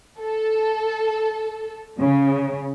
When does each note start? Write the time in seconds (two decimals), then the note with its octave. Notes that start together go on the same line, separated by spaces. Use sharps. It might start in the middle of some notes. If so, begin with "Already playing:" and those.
0.21 A4
2.00 C#3